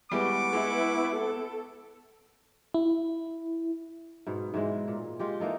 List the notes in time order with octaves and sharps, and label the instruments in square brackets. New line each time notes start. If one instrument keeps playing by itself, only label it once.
[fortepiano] G3 G#3 E4 [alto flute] B3 [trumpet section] C#6 D6
[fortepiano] G#3 [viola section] E4
[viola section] A4
[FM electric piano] E4
[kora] G#2 B2
G#2 E3 G#3
A#2
G#3 F4 G4
E3 A#3 D#4 A4